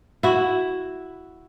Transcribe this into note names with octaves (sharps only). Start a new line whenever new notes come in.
E4 F#4